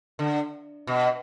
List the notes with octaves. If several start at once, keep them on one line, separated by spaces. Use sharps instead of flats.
D3
B2